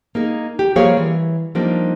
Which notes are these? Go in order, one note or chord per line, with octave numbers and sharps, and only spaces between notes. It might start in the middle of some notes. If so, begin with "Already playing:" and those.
A#3 D#4 G#4
G4
F3 G3 A#3 G#4 C#5 F5
E3
F3 G3 A#3 D4 D#4